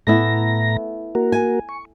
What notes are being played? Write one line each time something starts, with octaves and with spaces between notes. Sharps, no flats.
A2 A3 B3 E4 A#5 A#6
A#3 F#4 A#4
G#5
C#6